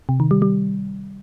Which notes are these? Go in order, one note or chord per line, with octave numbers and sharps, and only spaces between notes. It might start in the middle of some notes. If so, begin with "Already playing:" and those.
C3
D#3
G3
G3